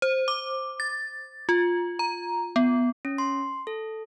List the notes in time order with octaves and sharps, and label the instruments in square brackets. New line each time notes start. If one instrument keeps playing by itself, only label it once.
[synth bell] C5
D6
A6
F4
A#5
B3
[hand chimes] C#4
C6
A4